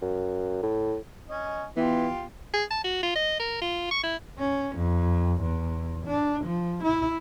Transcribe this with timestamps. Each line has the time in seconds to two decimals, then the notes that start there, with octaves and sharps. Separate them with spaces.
0.02 F#2
0.63 A2
1.29 C#4 D#5
1.77 E3 B3 F4 G4
2.54 G#4
2.71 A5
2.84 F#4
3.03 F4
3.16 D#5
3.40 A#4
3.62 F4
3.91 C#6
4.03 E4
4.39 C#4
4.76 F2
5.41 E2
6.06 D4
6.45 F3
6.83 E4